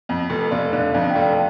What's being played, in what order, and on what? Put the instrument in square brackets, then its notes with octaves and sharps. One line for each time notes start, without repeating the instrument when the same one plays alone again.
[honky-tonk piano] F2
F1
[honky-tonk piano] F1 [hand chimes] D5 F5
[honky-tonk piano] D3 [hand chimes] D5 F5
[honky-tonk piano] F2 [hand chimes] D5 F5
[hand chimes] G5
[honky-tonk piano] F1 [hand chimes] D5 F5
[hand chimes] A5